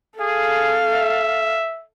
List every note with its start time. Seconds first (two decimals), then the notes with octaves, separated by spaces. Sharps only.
0.20 G#4 A4 F5
0.94 E5